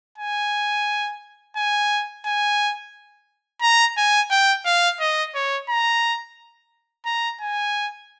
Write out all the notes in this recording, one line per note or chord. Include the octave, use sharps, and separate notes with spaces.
G#5
G#5
G#5
A#5
G#5
G5
F5
D#5
C#5
A#5
A#5
G#5